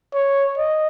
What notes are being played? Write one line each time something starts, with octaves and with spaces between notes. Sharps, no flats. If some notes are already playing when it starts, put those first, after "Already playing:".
C#5
D#5